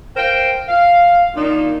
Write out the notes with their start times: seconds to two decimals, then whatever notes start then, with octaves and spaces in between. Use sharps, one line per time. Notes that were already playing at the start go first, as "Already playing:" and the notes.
0.17 A#4 C5 F5 G5
0.68 F5
1.35 A#2 D#3 D4 D#4 F4